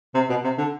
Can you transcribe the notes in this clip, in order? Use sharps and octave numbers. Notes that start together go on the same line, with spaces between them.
C3
B2
C3
D3